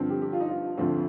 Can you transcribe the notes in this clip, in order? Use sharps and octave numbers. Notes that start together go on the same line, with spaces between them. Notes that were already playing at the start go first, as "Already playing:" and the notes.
Already playing: G2 D3 F3 C4
G4
G4
F4
D#4
F4
D2 D3 F3 C4